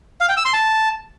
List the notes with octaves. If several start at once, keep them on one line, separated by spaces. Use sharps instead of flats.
F5
G5
E6
C6
A5